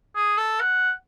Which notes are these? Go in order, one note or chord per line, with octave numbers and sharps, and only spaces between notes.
G#4
A4
F#5